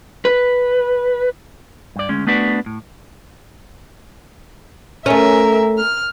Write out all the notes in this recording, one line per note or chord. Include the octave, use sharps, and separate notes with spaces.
B4
G2 D5
D2 G#3 C#4
A3 B3 D4 F#4 B4 D5
A2
A3 C#4 A#4 E5
F6